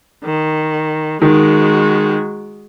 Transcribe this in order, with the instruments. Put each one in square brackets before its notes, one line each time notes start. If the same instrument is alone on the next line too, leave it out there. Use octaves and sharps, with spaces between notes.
[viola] D#3
[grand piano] D#3 [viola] G#3 F#4